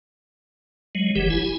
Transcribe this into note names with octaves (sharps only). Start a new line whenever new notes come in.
F#3 G#3
F#1 E3 G4
E4 G#5